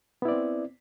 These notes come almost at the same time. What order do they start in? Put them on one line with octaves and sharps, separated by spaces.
B3 E4 D5 C4